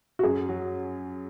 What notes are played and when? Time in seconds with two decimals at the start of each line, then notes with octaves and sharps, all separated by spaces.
0.19 F#4
0.23 F#2 G#4
0.49 F#3